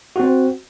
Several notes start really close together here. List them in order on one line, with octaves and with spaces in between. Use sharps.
F#4 C4 C5